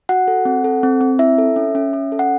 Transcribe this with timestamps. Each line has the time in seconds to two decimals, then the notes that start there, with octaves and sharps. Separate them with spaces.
0.09 F#4 F#5
0.28 A4
0.45 C4
0.64 A4
0.83 C4
1.01 C4
1.19 E4 E5
1.38 A4
1.56 C#4
1.75 C#4
1.93 C#4
2.12 A4
2.19 F#5